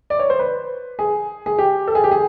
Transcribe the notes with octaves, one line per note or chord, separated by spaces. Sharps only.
D5
C#5
C5
B4
G#4
G#4
G4
A4
G#4
G4
G#4